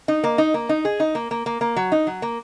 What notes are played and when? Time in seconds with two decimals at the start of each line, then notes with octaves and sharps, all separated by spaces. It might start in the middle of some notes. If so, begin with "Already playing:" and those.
0.08 D#4
0.24 A#3
0.38 D#4
0.54 A#3
0.69 D#4
0.85 G#4
1.00 D#4
1.15 A#3
1.31 A#3
1.46 A#3
1.61 A#3
1.76 F#3
1.92 D#4
2.07 F#3
2.22 A#3